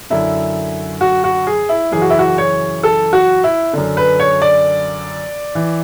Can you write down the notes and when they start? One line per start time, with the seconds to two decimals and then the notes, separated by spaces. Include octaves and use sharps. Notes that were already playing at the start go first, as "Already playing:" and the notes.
0.10 F#2 D3 E4
1.01 F#4
1.24 F#4
1.47 G#4
1.69 E4
1.91 F#2 C#3 E3 G#4
2.02 F#4
2.10 E4
2.19 F#4
2.38 C#5
2.83 A4
3.13 F#4
3.44 E4
3.73 F#2 D3
3.97 B4
4.20 C#5
4.42 D5
5.55 E3